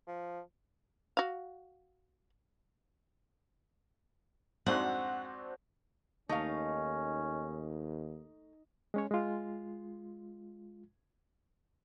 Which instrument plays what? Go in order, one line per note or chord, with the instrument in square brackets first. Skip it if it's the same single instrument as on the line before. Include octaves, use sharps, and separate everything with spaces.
[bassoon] F3
[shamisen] F#4 F5
[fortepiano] F2 G#2 C6 [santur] C4 D4 F#4 [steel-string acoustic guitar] F#5
[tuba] D#2 [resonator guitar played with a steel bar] A3 F5 [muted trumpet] C#4 [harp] D#4
[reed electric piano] G#3 C#4 C#5
G#3 F4